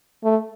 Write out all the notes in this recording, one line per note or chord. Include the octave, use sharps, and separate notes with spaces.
A3